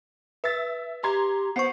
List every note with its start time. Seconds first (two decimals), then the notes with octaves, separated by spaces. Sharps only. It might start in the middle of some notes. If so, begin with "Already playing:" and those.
0.44 B4 E5 A6
1.03 G4 A#5 C6 G#6
1.56 B3 C5 C#6 C7